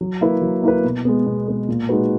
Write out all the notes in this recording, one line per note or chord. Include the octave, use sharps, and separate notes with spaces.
F#3
A#3 E4 B4
F#3
A#3 E4 B4
B2
G#3 B3
B2
G#3 B3
A#2
G#3 D#4 F#4 B4